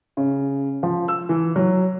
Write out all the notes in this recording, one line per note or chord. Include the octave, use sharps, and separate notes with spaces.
C#3
F3
E6
E3
F#3